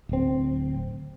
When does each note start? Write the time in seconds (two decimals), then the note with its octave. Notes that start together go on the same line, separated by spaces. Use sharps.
0.09 D1 C4